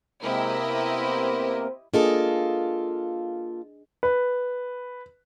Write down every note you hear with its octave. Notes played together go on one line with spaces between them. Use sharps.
C3 G#3 A#3 C4 E4 G4 A#4 D#5
B3 C4 C5
A#3 D4 F4 G#4 A4 D#5
B4